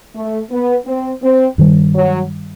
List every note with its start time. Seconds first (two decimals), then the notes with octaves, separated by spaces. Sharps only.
0.14 A3
0.51 B3
0.86 C4
1.22 C4
1.58 G2 D#3 G3
1.94 F#3